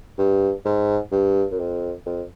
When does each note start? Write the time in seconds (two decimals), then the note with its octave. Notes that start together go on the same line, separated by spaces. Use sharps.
0.18 G2
0.65 G#2
1.12 G2
1.51 F#2
1.59 F2
2.06 F2